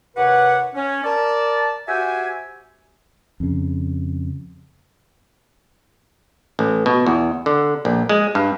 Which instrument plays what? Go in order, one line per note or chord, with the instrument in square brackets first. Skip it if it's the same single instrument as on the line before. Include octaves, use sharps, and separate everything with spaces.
[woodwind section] D#2 C3 G4 B4 C#5 F#5
C#4
A#4 D5 A5
F#4 G4 C5 E5 G5 G#5
[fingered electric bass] F2 C#3
[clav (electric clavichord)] A1
B2
E2
D3
A#1
G#3
G2